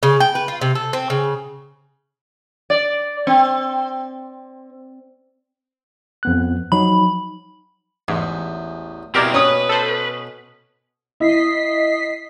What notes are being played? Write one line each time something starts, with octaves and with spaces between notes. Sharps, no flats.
C#3
G5
B4
F4
C3
A4
C4
C#3
D5
C4
F2 B3 F#6
F3 F#3 D#4 B5
A1 E2 G#2
B2 C4 E4 G4 A#4 D5
C#4 B4 D#6
A4 C5
E4 D#5 B6 C7